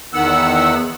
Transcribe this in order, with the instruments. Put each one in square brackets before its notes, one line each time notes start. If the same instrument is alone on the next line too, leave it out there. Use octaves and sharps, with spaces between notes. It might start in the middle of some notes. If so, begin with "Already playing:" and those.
[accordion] E2 D#3 B3 F#5 E6